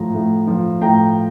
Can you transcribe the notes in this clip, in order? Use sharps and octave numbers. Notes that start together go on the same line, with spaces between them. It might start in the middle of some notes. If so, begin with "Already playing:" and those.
Already playing: A2 F3 A#5
A2
F3
A2 G5 A#5